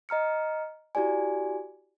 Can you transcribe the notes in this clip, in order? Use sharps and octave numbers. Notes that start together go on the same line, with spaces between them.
D#5 A#5 F6 C#7
E4 F#4 G4 D5 G#5